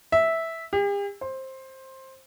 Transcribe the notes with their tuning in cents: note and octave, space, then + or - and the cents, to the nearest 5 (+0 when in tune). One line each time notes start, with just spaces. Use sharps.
E5 -10
G4 +45
C5 +15